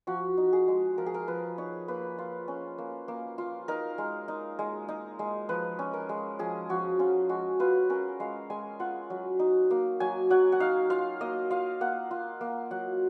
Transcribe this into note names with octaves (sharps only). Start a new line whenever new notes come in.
F3 F#4
D#4
G#4
G#3
F3 A#4
G#4
A#4
F3 B4
D#4 C#5
A#3 B4
F4
C#4
A#3
A#3
F4
D#4 A#4
G#3
D#4
G#3
D#4
G#3
F3 B4
C#4
A#4
G#3
F3 G#4
F3 F#4
C#4 F4
G#3 F#4
F4 B4
C#4 A#4
G#3 F5
G#3 G#5
F4 F#5
F#3
D#4
A#3
F#3 G#5
F#3 F#5
F#5
D#4 F5
F4 F5
A#3 D#5
F4 F5
A#3 F#5
F4
A#3
F#3 F#5